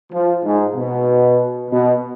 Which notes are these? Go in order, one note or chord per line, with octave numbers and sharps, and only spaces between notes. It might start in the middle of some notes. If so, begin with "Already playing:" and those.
F3
G#2
B2
B2